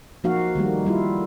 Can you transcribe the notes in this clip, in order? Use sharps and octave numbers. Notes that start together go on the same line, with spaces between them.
F3 A#3 D#4 F#4 F5
D#3 G3 A3 A#3
G3 E4 F4